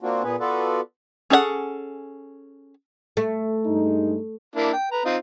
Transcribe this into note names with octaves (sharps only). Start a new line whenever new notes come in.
A#3 C4 D4 F4 F#4
A#2 B3 G#4 B4
B3 F4 F#4 A4 B4 D5
C#4 G#4 A4 D5 F#5
A3
G2 G#3 D#4
A#3 D4 E4
G5
B4 A#5
C4 D#4 F4